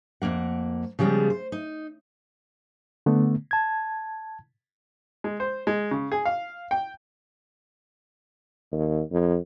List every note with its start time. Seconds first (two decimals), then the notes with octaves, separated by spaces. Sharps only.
0.22 F2 G#2 A#3 F#5
0.99 C#3 F3 G3 G#3 B3
1.30 C5
1.52 D#4
3.06 D3 A3 B3
3.51 A5 G#6
5.24 G#3
5.40 C5
5.67 G#3
5.91 C#3
6.12 G#4
6.25 F5
6.71 G5
8.72 D#2
9.11 F2